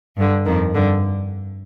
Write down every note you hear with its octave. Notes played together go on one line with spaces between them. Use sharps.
G2 D3
F2 D#3
G2 D3